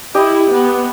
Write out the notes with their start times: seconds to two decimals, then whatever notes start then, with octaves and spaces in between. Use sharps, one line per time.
0.15 E4 G4 D#5
0.51 B3